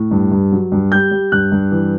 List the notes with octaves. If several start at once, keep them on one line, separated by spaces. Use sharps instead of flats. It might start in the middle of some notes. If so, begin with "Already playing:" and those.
Already playing: A2
G2
G2
F#3
G2
G3 G6
G3
G2 F#6
G2
E3